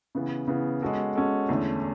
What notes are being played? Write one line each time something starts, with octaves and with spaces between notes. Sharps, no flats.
C#3 E3 B3
C#3 E3 B3
G#3 C#4 F#4 A4
G#3 C#4 F#4 A4
E2 D3 A3 C#4